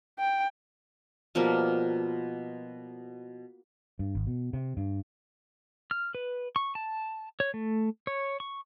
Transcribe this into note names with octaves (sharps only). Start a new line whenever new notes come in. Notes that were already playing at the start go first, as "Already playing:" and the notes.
G5
B2 F3 G3 A#3
G2
G#1
B2
C3
G2
F6
B4
C#6
A5
C#5
A3
C#5
C#6